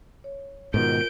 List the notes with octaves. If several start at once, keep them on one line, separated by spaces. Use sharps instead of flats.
C#5
G#2 B2 D#3 F4 A#4 G6 D7